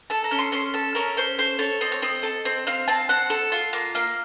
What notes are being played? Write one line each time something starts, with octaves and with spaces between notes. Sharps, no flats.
A4 A5
A#5
C#4
C6
C#4 C6
A4 A5
C#4 A#4
C#4 C5
A4 C5
A4 C#5
C4 D#5
C#5
C4 D#5
A4
C4
C4 F5
C4 A5
C4 F#5
A4
F4
A#3
A#3 F5